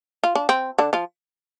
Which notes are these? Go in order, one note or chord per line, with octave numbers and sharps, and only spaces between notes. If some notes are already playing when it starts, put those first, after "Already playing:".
F4
D4
C4
D3 D4
F3 F4